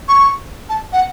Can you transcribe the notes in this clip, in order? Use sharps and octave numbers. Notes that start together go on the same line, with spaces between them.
C#6
A5
F#5